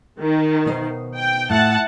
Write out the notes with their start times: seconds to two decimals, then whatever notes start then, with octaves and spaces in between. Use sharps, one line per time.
0.21 D#3
0.66 B2 D#4 C5
1.16 G5
1.50 A2 F#5 A5